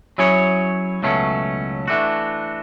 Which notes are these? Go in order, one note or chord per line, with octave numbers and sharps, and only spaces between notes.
F#3 C#4 E4 G#4 C#5
C#2 B2 F#3 A3 C#4
E3 A3 D4 F#4